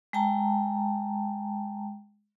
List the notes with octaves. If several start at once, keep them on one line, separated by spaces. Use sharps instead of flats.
G#3 G5 A5 A#5